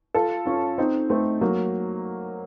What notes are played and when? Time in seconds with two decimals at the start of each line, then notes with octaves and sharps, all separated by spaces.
0.14 F4 A4
0.46 C#4 F4
0.78 C4 D#4
1.10 A3 C4
1.41 F#3 A#3